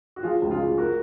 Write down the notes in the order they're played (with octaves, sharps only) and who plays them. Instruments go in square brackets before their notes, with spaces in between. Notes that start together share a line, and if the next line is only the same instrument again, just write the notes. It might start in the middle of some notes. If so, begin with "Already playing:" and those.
[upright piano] F#4
F3 F4 G#4
C#2
F4 G#4
G#3
F#4 A#4